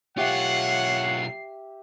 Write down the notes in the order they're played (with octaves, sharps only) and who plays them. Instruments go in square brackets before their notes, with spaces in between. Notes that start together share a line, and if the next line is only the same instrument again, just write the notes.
[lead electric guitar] B1 F4 [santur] G4 E5 [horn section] C#5 F#5 [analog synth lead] C7